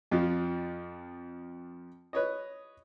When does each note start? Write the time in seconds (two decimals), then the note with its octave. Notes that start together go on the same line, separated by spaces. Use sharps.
0.11 F2 F3 F4
2.13 B4 C#5 D#5